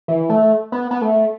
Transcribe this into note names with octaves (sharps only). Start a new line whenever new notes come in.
E3
A3
B3
B3
A3